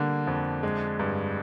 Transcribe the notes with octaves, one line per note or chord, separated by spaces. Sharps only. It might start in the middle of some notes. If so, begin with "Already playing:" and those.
Already playing: D3 G3 A#3
F2
G#3
G2